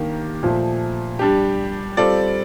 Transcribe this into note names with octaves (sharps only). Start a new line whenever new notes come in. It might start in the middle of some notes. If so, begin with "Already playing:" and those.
Already playing: D#3 A#3 D4 G4 A#4
A#2 F3 A3
G3 D4 G4
G3 C4 F4 A4 D5